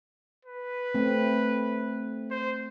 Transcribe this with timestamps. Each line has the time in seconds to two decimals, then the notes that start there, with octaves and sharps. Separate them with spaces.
0.45 B4
0.95 A3 C4
2.31 C5